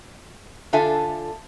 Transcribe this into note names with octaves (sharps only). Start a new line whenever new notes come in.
D3 D4 F4 A4 E5 G#5